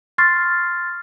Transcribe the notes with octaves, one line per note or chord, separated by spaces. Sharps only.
C6 C#6 F6 A6 C7